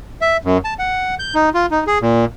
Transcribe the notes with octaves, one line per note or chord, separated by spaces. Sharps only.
E5
F#2
A5
F#5
G6
D#4
F4
D#4
G#4
A#2